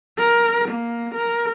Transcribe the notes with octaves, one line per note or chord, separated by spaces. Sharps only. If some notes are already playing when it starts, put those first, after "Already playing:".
A#4
A#3
A#4